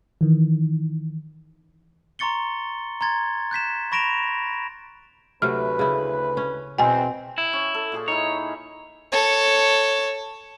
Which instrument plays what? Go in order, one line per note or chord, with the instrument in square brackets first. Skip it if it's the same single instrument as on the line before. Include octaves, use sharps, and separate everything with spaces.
[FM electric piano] D#3 E3
[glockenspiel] A#5 C6 C#6 A6 C#7 G7
A#5 C6 G#6 A6
F#6 G6 B6 E7
B5 C#6 A#6 D7 E7 F7
[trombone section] D2 B4 [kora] C3 F#3 A3 [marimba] F6
[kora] C#3 E4
C#4
[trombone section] E2 C4 [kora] B2 [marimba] G5 G#5
[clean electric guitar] E4
[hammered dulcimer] C#4
A4
A#2 G#4 A5
[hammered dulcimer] D#4 E4 [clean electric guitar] C#5
[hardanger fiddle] A4 C#5